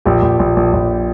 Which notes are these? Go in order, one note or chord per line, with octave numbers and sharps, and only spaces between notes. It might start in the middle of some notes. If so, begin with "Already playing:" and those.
A#1 G4
A#1
A#1
A#1
A#1